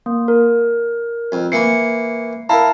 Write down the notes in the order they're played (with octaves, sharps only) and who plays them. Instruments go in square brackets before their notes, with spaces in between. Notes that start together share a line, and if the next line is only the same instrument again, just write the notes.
[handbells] A#3
A#4
[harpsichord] F2
[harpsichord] E3 A#3 C#6 [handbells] C7 C#7
[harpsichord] E4 A#4 [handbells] F5 A5 A#5